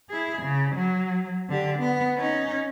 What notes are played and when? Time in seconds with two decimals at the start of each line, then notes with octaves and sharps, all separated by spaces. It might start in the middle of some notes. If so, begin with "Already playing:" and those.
0.10 E4 G#4
0.43 C#3
0.76 F#3
1.49 D3 G4
1.79 B3
2.18 C#4 D#4